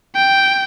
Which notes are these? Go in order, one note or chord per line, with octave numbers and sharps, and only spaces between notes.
G5